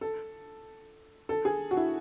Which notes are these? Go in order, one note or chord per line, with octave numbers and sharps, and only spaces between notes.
A4
A4
G#4
F#4
E4